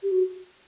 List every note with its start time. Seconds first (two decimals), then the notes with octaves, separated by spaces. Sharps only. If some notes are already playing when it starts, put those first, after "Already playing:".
0.03 G4
0.12 F#4